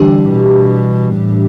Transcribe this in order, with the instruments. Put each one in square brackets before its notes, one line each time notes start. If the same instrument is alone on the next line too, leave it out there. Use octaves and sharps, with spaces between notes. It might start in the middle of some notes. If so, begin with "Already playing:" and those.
Already playing: [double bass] D3 [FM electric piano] E3 G3 D4 G4
[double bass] B2
A2